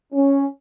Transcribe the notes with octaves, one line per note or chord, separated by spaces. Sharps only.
C#4